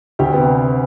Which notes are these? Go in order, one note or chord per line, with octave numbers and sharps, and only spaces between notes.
D2 G4
C3 B3